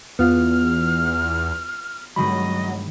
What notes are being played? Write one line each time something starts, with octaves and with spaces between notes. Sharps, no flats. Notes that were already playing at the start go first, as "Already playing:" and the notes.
E2 B3 F4 F6
G2 D#3 F#3 D#5 B5